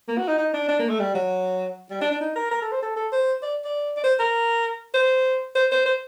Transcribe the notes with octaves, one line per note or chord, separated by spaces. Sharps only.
A#3
F#4
D#4
D#4
D4
D4
A#3
A3
G3
F#3
G3
D4
D4
D#4
A#4
A#4
A4
C5
A4
A4
C5
D5
D5
D5
C5
A#4
C5
C5
C5
C5